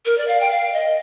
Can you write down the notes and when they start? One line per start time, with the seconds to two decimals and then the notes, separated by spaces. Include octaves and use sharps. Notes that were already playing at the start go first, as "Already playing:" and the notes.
0.06 A#4
0.18 D5
0.28 F5
0.40 G5
0.50 F5
0.73 D#5